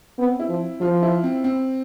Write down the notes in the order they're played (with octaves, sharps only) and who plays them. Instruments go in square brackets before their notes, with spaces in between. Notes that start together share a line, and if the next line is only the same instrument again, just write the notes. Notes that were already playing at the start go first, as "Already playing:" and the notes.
[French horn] B3 [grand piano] C4
[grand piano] E4
[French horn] F3
[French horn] F3 [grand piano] F4
[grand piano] E4
C4
C4